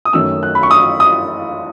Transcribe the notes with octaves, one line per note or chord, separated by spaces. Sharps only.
D#6
F#2 D#3 A3 C#4 E6
F#6
B5
C#6
D#6
D#6